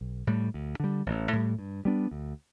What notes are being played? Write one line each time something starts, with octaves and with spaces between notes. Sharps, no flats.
B1
A2 G3
D2
D3 G3
A1
A2 G3
G2
G3 B3 D4
D2